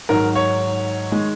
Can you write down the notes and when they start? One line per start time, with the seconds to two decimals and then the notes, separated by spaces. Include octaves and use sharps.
0.09 G#2 D#3 F#3 A#4
0.36 C#5
1.12 D#3 G#3